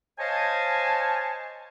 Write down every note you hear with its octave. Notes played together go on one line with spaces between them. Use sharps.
C5 C#5 D#5 F5 G#5 A5